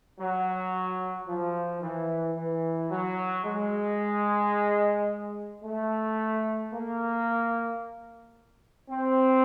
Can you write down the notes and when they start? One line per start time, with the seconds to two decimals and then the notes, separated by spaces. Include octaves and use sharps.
0.18 F#3
1.27 F3
1.81 E3
2.36 E3
2.90 F#3
3.44 G#3
5.63 A3
6.72 A#3
8.89 C4